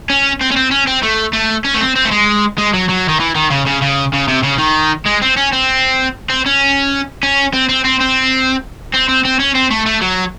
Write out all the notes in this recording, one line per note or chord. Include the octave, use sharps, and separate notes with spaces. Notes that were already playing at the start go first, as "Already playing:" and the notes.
C#4
C4
C#4
C4
C#4
C4
A3
A3
C#4
A3
C4
C4
A3
G#3
G#3
F#3
F#3
D#3
E3
D#3
C#3
C#3
C#3
C#3
C3
C#3
D#3
G#3
C4
C#4
C4
C4
C#4
C#4
C4
C4
C4
C4
C4
C4
C4
C#4
C4
A3
A3
F#3